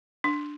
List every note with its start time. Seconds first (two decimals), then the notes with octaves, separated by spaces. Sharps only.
0.24 D4